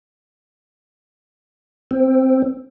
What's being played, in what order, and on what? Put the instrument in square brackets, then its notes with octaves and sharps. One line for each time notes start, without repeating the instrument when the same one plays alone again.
[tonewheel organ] C4